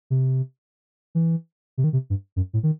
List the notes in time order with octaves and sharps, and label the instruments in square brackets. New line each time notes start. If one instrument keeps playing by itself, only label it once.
[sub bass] C3
E3
C3
D#3
C3
G2
F#2
A2
D#3